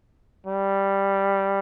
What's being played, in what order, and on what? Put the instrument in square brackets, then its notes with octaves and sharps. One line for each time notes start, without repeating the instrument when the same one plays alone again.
[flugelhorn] G3